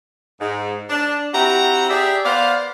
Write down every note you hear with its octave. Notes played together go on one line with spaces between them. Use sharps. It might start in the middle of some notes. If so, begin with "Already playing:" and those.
G#2
D4
C4 E4 F#4 G4 A#5
G4 G#4 D5 E5
B3 C5 D5 F5